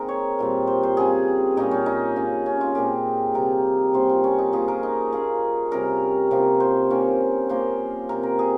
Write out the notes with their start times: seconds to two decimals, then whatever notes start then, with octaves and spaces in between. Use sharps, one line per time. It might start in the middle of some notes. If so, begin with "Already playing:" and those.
Already playing: D#3 G#3 A#3 C4 D#4 G#4 A#4
0.08 C#5
0.39 A#2 G3 C4
0.67 C5
0.83 C5
0.97 C#3 G3 C4 G#4
1.57 A#2 G3 A#3 C#4 D#4
1.71 C#4
1.86 D#4
2.16 C#3 G#3 C#4
2.46 C#4
2.61 F4
2.75 A#2 G#3 C4 G4
3.34 C3 D#3 G3 A#4
3.94 C3 G3 A#3 C#4 C5
4.09 F4
4.24 C#4
4.38 D#4
4.53 F3 A#3 C#4 G#4
4.68 A#4
4.83 D#4
5.12 F3 A#3 C#4 G#4
5.71 C3 G3 C#4 A#4
6.31 C3 F3 A#3
6.60 C5
6.90 D#3 A#3 C#4
7.49 F3 A#3 C#4 C5
8.09 C3 F3 C4 A#4
8.23 A#4
8.39 G#4